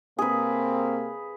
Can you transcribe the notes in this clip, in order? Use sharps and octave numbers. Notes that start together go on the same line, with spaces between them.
C3 A#3 C4 G#4 B4